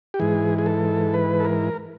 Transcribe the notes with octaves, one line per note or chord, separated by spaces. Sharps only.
G4
G#2 E3 G#4
G#4
A4
B4
A4
A#4